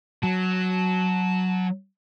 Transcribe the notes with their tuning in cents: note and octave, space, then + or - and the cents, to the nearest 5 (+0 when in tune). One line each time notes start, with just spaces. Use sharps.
F#3 +0 A5 -15